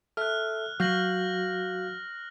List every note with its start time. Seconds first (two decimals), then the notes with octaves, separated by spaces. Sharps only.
0.17 A4 E5 F6 F#6
0.80 F#3 F#4 F5 F6 G6 A#6 F#7